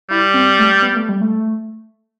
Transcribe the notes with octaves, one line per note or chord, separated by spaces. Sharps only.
G3 E4
C4
A3
B3
A3
G3
A3